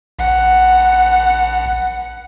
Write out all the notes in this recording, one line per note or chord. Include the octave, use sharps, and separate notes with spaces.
A#1 F#5